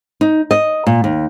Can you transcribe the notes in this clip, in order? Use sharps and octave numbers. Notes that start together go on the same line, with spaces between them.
D#4
D#5
A#2
D#2